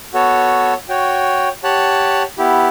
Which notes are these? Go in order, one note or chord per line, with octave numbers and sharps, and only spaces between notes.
B3 F#4 A4 C#5
F#4 C#5 G5
G4 C#5 F#5 A5
B3 E4 G4